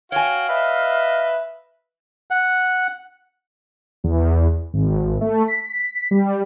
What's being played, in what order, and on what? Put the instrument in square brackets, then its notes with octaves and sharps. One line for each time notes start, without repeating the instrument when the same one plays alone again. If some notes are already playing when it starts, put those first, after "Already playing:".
[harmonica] F#4 G5 [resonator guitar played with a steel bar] C#5 G#5 [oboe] F5
[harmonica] B4 D#5 [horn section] E5
[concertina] F#5
[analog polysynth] E2
G#1
A3
B6
G3